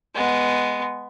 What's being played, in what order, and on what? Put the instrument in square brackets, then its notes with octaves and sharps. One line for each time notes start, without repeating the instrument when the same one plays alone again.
[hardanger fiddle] G#3 B3